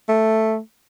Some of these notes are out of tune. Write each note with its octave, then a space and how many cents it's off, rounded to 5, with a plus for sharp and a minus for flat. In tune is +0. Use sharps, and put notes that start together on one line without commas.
A3 +0